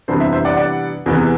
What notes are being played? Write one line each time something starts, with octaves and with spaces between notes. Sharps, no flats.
C3 E3 G3 B3 D4 C5
C5 E5
C5 E5
D5 F#5
D5 F#5
E2 C3 E3 B3